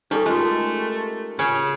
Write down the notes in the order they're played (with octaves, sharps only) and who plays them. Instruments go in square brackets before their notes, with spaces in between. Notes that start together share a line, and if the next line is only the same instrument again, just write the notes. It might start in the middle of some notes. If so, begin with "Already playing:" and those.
[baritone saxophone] G3 [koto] C#4 [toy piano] D#4 G#4 A4
[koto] G#3 [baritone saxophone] A3 [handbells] F4 G4 A#4
[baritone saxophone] C#3 [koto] C#4 [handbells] C#5